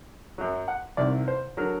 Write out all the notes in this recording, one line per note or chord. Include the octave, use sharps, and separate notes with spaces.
F#2 F#3
F#5
C2 C3 D#3 D5
C5
D3 F#3 A#4